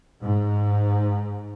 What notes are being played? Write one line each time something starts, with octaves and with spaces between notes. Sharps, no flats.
G#2